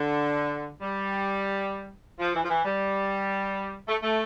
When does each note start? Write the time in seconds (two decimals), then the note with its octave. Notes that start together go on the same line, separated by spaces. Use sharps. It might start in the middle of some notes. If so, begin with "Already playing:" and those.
Already playing: D3
0.81 G3
2.19 F3
2.35 E3
2.44 F3
2.50 E3
2.65 G3
3.88 A3
4.03 A3